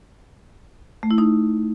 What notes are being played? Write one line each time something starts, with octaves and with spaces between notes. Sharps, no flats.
A3
E4
D#4